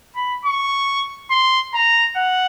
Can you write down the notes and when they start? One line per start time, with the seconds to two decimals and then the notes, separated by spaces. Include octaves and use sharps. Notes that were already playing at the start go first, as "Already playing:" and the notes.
0.16 B5
0.45 C#6
1.30 C6
1.74 A#5
2.17 F#5